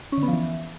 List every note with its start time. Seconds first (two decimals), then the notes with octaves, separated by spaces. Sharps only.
0.12 C#4
0.17 D3
0.23 B3
0.28 F3
0.33 E3